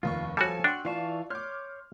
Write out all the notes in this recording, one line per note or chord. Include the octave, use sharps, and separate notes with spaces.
F1 D#2 F4 C#6
F3 G3 F#4 A4 C#5 G#5 E6
D4 F#4 F#5 G5 C6
E3 F4 D5 F5 A5 C#6
C#5 C6 D6 F6 G6